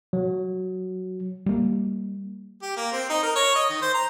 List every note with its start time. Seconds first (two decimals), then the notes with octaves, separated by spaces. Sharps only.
0.13 F#3
1.46 G3 A#3
2.62 G4
2.77 A#3
2.92 C4
3.10 D#4
3.23 A#4
3.36 C#5
3.56 D#5
3.70 D#3
3.82 C5
3.94 A#5